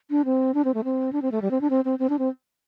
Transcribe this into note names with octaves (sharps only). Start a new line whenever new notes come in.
D4
C4
D4
C4
A3
C4
D4
C4
A3
G3
C4
D4
C4
C4
C4
D4
C4